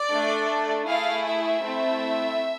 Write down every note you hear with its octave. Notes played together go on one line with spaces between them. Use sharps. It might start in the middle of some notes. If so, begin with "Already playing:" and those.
Already playing: D5
A3 D4 A4
A3 E4 G#4 F5
E5
A3 C4 E4